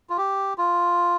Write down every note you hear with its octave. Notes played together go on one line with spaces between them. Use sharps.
F4
G4
F4